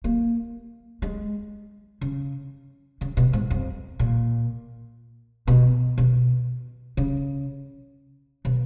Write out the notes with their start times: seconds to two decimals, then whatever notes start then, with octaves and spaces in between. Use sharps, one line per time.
0.04 A#3
1.02 G#3
2.01 C#3
3.01 C#3
3.17 B2
3.33 G#2
3.50 F2
3.99 A#2
5.48 B2
5.98 B2
6.97 C#3
8.45 B2